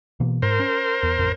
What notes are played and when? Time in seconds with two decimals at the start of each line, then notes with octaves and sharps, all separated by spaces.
0.20 B2 E3 A#3
0.42 G#2 A#4 C5
0.60 C#4
1.03 E2
1.19 A1 F2